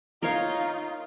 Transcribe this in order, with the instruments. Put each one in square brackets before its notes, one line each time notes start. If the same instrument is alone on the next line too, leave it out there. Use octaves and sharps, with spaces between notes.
[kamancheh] D#4 F4 [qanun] A#4 C#5 F5